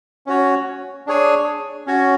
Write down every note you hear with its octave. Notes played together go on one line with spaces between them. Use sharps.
C#4 F#4 C#5
D4 G#4 C#5 G#5
C#4 F#4 C#5